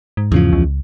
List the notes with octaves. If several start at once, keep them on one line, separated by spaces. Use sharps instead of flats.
G#2
E2 C#3 F3
C#2